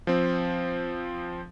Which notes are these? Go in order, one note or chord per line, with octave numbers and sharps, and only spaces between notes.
F3 C4